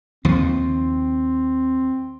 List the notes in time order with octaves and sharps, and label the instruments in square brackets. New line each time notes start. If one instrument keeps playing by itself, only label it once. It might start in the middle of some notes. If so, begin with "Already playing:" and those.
[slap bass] D#2 F3 [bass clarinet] C4